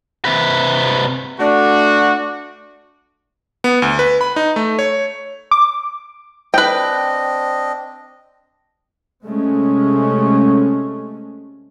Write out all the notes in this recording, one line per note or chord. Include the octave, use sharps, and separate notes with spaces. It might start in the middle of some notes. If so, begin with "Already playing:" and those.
C3 B4
A3 D4 F#4
B3
D2
B4
B5
D#4
A3
C#5
D6
C4 D4 B4 D#5 G5
C3 G#3 A3 C#4